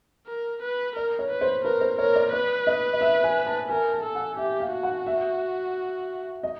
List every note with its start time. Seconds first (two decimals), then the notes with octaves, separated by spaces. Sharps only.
0.27 A#4
0.62 B4
0.96 A#4 D5
1.19 C#5
1.30 B4
1.41 C5
1.64 A#4 B4
1.81 C5
1.98 A#4 C#5
2.16 D5
2.33 B4 D5
2.67 D#5
2.93 D#5
3.01 E5
3.24 G#5
3.46 A5
3.69 A#4 G#5
3.92 A5
4.04 A4
4.15 F#5
4.37 G4 E5
4.60 F5
4.73 F#4
4.83 F#5
5.07 E5
6.43 D#5